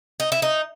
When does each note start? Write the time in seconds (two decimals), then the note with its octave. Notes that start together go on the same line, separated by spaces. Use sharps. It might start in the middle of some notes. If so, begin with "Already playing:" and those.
0.20 D#4
0.32 E4
0.42 D#4